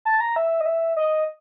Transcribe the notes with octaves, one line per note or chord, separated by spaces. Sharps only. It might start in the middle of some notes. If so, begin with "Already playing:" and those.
A5
A#5
E5
D#5
E5
D#5